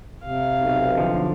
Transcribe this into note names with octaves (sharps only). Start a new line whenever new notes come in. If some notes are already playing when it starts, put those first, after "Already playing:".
C3 F5
B1
D3 F3